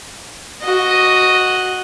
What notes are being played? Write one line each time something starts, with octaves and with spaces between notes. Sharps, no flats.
F#4 D#5